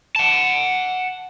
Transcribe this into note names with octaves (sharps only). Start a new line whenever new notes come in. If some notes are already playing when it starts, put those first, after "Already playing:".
F#5 A5